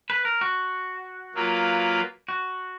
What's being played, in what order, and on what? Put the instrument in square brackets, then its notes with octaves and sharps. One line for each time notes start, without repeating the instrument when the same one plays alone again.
[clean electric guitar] B4
A#4
F#4
[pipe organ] F#3 A#3 F4 B4
[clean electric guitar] F#4